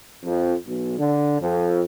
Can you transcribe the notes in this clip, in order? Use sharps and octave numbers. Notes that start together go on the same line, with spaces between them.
F2
B1
D3
F2